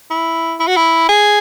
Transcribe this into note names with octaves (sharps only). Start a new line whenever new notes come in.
E4
E4
F#4
E4
G#4